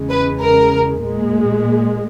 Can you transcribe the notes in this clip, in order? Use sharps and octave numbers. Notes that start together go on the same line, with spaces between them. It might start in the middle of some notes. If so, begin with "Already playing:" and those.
Already playing: E2 C#3 G#3
B4
A#4
A#2 G#3